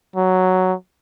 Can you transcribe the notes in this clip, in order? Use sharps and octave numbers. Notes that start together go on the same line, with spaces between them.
F#3